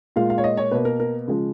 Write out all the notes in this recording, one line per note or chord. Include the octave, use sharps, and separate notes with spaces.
A#2 G#3 F5
F5
C#5
D#5
C#5
B2 A#3 B4
A#4
A#4
C#3 F3 G#3